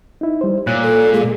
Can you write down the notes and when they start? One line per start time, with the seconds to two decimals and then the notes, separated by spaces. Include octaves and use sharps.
0.21 D#4 E4
0.41 G3 C5
0.67 A#2 C#5 F#6
0.82 A4
1.13 G#3 G#4